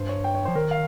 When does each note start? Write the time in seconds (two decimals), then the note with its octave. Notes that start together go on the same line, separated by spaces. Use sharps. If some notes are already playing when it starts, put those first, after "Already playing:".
Already playing: G2 C5
0.09 C#5
0.24 G5
0.35 C#5
0.45 C5
0.48 F3
0.55 D#3 A#4
0.71 F5